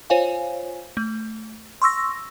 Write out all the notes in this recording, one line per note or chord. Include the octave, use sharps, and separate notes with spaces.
F4 C5 C#5 F5 G#5
A3
C6 C#6 E6 A#6